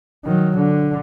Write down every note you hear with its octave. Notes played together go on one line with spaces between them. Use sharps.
D#3 F#3
D3